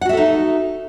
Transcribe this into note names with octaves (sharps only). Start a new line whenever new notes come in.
D#4 F#4 A4 E5 F#5